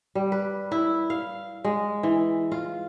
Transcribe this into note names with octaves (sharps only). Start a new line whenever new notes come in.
G3
B4
E4
F5
G#3
E3
F4